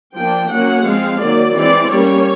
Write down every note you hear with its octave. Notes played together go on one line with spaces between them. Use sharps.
F3 A#3 D4 G5
F#3 A#3 C#4 F#5
F3 G#3 C4 F5
D#3 F#3 A#3 D5
E3 G#3 C4 D5
G3 A#3 C#4 C#5